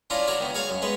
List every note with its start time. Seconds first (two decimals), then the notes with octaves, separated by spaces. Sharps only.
0.10 C#4 D4 E4 F4 F5 A#5
0.27 D4 E4 F#4 A#4 C#5
0.40 D#3 B3
0.55 G#4 C#5 F5 G#5 A5
0.70 F#2
0.82 G#3 B3 B4 C#5